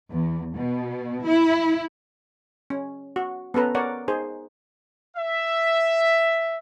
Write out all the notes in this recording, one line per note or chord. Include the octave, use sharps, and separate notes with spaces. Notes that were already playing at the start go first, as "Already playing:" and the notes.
E2
B2
E4
C#4
F#4
B3 C#4 A4 B4 A#5
A#4 C#5 D5 F#5
D#4 G#4 C5
E5